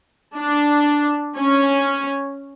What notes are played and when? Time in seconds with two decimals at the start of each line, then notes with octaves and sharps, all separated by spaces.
0.37 D4
1.36 C#4